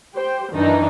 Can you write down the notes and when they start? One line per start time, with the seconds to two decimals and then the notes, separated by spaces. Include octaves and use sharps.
0.14 G4 C5 G5
0.52 F#2 D#3 E3 D4 D#4